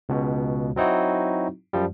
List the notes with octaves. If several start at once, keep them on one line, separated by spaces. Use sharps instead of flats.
C#2 B2
F#3 C4 D#4 E4 F#4
F#2 F3 G3